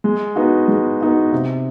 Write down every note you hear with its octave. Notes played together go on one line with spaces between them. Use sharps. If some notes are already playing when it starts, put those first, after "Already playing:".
G#3
B3 D#4 F#4
G#3
B3 D#4 F#4
C3